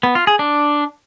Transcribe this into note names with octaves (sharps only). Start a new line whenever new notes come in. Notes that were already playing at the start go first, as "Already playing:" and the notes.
B3
F4
G#4
D4